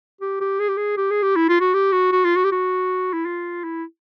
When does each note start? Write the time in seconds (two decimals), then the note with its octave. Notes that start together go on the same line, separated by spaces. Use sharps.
0.21 G4
0.40 G4
0.60 G#4
0.69 G4
0.77 G#4
0.97 G4
1.11 G#4
1.23 G4
1.36 E4
1.49 F4
1.60 F#4
1.74 G4
1.92 F#4
2.12 F#4
2.25 F4
2.36 F#4
2.44 G4
2.52 F#4
3.13 E4
3.26 F4
3.64 E4